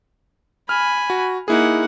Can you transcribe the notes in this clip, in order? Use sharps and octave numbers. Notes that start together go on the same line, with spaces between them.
G#5 B5 F6
F#4
A#3 D#4 E4 G#4 F#5